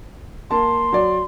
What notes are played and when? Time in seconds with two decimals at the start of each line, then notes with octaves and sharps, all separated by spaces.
0.51 A#3 A5 C6
0.93 F#3 D5